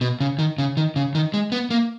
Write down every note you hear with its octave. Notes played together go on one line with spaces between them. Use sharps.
B2
C#3
D#3
C#3
D#3
C#3
D#3
G#3
B3
A#3